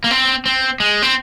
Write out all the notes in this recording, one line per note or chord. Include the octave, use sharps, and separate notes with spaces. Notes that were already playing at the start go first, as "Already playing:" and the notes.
A#3
C4
C4
G#3
C4